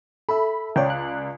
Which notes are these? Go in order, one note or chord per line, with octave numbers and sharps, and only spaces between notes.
A4 E5 B5
C#2 C#5 D5 G5
F#6